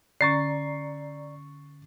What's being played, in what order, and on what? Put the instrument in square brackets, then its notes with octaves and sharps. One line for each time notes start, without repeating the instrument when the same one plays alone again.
[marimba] D3 C#4 [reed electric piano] D5 A#5 [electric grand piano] C#6 A6 C7